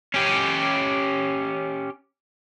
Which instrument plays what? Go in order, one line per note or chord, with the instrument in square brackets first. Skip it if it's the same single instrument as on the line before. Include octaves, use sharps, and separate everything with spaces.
[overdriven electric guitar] C#4 G4